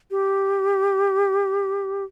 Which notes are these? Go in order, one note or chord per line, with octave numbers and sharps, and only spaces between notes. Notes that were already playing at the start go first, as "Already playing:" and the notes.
G4